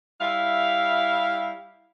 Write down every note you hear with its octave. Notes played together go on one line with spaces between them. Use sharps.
G3 E4 E5 F5